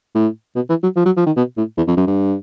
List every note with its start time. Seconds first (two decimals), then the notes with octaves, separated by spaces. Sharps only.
0.15 A2
0.55 B2
0.69 E3
0.83 F#3
0.97 F3
1.06 F#3
1.17 F3
1.26 D#3
1.36 B2
1.57 A2
1.77 E2
1.88 F2
1.97 F#2
2.07 G2